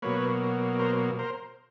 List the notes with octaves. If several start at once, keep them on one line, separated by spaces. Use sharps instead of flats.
B2 F#3 A#3 B4 C#5
A#4 C5
A#4 C5